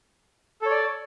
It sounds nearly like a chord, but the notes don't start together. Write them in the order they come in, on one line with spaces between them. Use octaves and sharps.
A4 C#5 D5